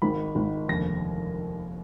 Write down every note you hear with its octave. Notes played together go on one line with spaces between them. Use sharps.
G#1 G#2 D#3 B5
G#1 G#2 D#3
F1 D#2 D3 A#6